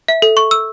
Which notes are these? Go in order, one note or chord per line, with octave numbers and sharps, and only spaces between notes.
E5
A4
C#6
E6